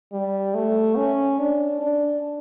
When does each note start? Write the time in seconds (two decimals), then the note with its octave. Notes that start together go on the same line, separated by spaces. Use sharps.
0.13 G3
0.55 A3
0.97 C#4
1.39 D4
1.82 D4